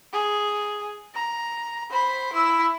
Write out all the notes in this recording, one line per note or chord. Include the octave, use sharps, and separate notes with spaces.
G#4
A#5
C5 B5
E4 E6